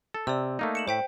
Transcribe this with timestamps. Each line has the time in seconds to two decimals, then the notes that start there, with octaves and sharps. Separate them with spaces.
0.14 A4
0.27 C3 D5 E6
0.59 A3 A#3 D#4
0.75 C#7 E7 F#7
0.88 A2 C5 G5 B6